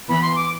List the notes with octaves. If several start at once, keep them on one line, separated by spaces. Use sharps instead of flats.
E3 B3 B5
C6
D6